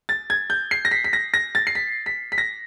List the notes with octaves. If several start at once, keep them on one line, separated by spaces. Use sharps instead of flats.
A6
G#6
G6
C7
A#6
B6
B6
A#6
A#6
A6
C7
B6
B6
B6
A#6